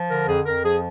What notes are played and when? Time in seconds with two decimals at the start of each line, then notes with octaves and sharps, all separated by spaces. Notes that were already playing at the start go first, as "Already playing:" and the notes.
Already playing: F3
0.09 D3 A#4
0.27 F2 G#4
0.45 F2 A#4
0.63 F3 G#4